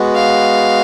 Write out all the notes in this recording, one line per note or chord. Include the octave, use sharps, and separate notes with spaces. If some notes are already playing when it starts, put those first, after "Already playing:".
Already playing: G#3 B3 F#4
F5